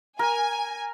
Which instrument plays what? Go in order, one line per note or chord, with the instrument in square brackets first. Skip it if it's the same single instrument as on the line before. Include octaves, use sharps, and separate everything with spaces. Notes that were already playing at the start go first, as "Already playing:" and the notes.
[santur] A#4 [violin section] G#5